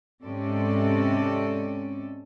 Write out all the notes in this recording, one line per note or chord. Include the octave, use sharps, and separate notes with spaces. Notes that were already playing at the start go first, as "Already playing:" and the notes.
G#2 C3 C#4 A4 D5